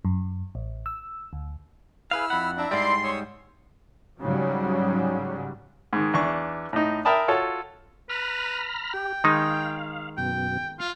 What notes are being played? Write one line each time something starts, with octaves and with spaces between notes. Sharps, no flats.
F#2
A1
E6
D2
E4 G#4 B4 F5 E6 F6
F2 F#5 B5
D4 E4 E5 A#5
G#2 G3 D5 C6
C#5 D#6 E6
G#2 C#3 F#3 G3
G#2 D#3
E2 D4 C#6
A2 D#4
A#4 E5 G5 A5 B5 D#6
F4 F#4 A4 C#5
B4 A#5 B5 F6
G4 G5
D#3 G#3 D#4 F5
F#2 B2 G5
F4 F5